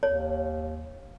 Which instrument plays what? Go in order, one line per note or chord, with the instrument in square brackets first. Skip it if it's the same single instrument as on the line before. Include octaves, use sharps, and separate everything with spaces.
[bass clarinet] D#2 [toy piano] C#5